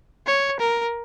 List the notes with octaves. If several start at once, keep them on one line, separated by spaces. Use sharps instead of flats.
C#5
A#4